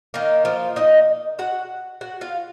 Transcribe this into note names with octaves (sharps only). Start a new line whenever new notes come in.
D#3 A#3 D#4
F3 F4
D#4 D#5
F#4 F#5
F#4 F#5
F4 F5